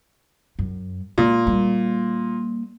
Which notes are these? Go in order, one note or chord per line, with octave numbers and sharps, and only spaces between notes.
F#2
A#2 G#3
G3 A#3